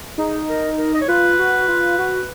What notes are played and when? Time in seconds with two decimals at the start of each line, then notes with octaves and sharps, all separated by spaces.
0.18 D#4 G#4
0.48 A#4
0.78 A#4
0.94 D#5
1.01 C#5
1.08 F4 B4
1.39 F#4
1.68 F4
1.98 F#4